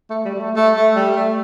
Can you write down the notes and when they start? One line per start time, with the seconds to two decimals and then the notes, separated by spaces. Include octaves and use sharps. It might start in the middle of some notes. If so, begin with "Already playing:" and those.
0.10 A3
0.25 G3
0.35 G3
0.40 A3
0.56 A3
0.75 A3
0.95 G3
1.16 A3